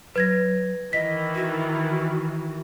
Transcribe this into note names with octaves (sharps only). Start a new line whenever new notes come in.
F#3 B4 G#6 A#6
D#3 E3 D#5 B6
F#4